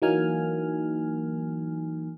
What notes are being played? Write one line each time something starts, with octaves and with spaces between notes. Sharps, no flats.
E3 F#3 A#3 D#4 G#5 F6